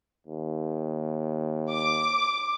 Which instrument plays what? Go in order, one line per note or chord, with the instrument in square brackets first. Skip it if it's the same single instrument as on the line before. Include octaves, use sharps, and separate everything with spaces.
[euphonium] D#2
[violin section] D6